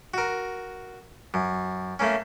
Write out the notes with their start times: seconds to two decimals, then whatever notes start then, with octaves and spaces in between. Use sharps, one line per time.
0.14 F#4 A#4
1.34 F#2
1.99 A3 A#3 C#4